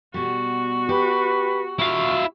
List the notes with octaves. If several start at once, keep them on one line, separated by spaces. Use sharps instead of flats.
B2 G3 F#4
G4 B4
E4 F4 F5 C#6